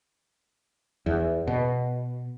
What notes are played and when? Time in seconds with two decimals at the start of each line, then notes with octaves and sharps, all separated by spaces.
1.06 E2
1.47 B2